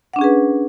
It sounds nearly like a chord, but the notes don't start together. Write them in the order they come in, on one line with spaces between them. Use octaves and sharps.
F#5 D4 C#4 G#4 B4